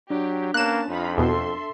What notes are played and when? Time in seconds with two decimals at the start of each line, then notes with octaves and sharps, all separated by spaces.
0.10 F#3 D4 G4
0.54 A#3 B3 C#4 A5 F#6 E7
0.89 F2 D#4 F4 B5
1.18 E2 B2 A4 E5 C6